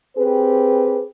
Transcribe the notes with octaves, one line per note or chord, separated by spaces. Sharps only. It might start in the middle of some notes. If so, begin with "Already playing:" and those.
C4 G4 G#4 B4